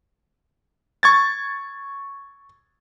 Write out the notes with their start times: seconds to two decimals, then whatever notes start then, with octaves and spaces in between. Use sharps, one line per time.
1.03 C#6 G#6 A6